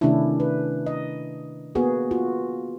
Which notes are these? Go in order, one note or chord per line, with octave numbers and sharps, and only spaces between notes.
C3 D#3 A3 C#4 D4 E4
B4
D#5
A#3 B3 F#4 G#4
F4 F#4